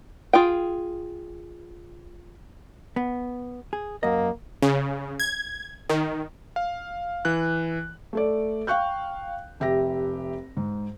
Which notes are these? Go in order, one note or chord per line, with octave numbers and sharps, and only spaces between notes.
F4 G#4 G5
B3
G#4
F#2 A#3 D#5
C#3
G#6
D#3
F5
E3 F#6
A3 A4 D5
F5 G5 C#6 F#6 G6
F1 G4 E5 A#6
G#2